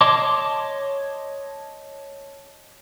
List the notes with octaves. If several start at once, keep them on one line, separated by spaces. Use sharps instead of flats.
C#5 D#5 A5 C6 D6